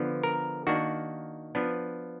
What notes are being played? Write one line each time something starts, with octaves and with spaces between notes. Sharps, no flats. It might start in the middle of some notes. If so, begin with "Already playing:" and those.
Already playing: D3 F3 B3
A#4
D#3 A#3 D4 F#4
F3 B3 D4